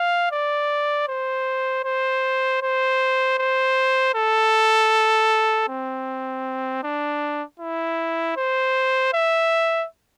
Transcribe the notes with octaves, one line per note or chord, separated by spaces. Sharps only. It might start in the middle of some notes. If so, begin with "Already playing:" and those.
Already playing: F5
D5
C5
C5
C5
C5
A4
C4
D4
E4
C5
E5